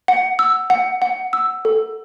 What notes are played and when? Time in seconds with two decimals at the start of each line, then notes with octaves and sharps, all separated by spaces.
0.08 F#5
0.39 E6
0.70 F#5
1.02 F#5
1.33 E6
1.65 A4